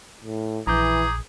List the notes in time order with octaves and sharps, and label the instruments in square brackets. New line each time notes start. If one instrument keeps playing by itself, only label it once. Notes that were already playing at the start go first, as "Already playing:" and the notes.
[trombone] A2
[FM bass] A#1 [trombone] E3 [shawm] G#4 [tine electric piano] A#5 D6 G6